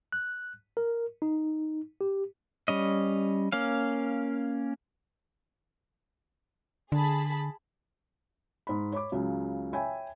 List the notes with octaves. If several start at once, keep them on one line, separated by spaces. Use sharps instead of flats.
F#6
A#4
D#4
G4
G3 C#4 D#5
A#3 C#4 F5
D3 G#4 A5 B5
G#2 B5
C#5 B5 D6
C#2 C#3 F#3
C#5 E5 G5 G#5 B5